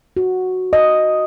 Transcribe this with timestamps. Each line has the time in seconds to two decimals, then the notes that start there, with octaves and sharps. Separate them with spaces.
0.17 F#4
0.73 D#5